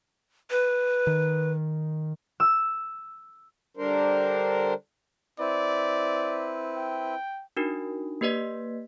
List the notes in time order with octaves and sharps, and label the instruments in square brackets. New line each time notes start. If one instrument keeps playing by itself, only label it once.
[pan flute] B4
[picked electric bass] D#3
[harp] E6
[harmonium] D3 G3 D4 A#4 C5
[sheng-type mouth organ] C4 E4 B4 [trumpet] D5
[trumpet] G5
[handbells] D4 D#4 F#4 A#4
A#3 G4 B4 D5 D#5 B6